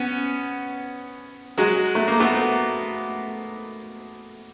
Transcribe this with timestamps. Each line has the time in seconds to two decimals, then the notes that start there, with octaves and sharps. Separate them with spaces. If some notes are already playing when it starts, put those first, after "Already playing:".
Already playing: B3 C#4
1.58 F#3 G#3
1.95 A3
2.08 A#3
2.20 A3 B3